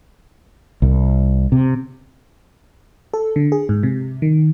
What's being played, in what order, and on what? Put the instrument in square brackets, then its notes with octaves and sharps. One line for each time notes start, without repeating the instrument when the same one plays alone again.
[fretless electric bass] C2
C3
[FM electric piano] A4
D3
G#4
G#2
C3
D#3